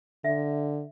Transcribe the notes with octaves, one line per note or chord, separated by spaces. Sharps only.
D3 E5